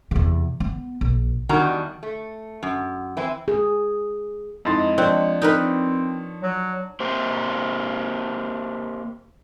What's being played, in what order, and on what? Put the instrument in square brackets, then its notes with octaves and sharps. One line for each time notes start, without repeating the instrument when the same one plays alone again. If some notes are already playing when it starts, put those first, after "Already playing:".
[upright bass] E2 C3
B3
A#1
[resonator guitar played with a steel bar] E2 D#3 G3 D4 F#4 A#5
A3
F#2
E3 C4 E4
[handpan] G#4
[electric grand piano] F2 E4 A6 [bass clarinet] G#3 [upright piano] D#4 C6
[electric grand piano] F3 C#5 [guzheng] C4 [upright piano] D4 F#6
[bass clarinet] C4 [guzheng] D#4 A#4 B4
[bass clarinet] F#3
[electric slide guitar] A#3 G4 C5